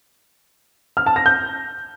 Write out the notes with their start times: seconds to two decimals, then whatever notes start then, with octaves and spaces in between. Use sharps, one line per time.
0.97 F6
1.06 A5
1.16 A#6
1.26 G6